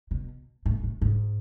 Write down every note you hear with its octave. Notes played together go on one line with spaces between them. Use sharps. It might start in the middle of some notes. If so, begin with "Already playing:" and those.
B2
A2
A2
G#2